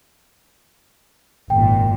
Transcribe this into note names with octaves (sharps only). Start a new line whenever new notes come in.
G#1 F#2 A#2 G5